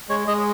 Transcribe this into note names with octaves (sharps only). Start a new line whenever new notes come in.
G#3 C#5
G#3 D#5